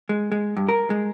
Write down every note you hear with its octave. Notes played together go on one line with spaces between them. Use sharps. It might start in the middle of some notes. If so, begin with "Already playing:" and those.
G#3
G#3
G2
A#4
G#3